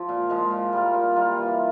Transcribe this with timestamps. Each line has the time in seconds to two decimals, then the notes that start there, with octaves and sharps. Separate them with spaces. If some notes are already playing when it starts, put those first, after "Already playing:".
Already playing: F3
0.09 A#2
0.30 F3 G#3
0.51 A#2
0.73 G3 A#3 F4
0.94 A#2
1.16 G3 A#3 F4
1.37 E3